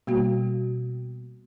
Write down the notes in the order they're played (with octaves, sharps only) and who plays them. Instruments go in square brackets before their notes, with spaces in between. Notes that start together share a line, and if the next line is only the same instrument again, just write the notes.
[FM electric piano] B2 [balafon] G3 A#3 F#4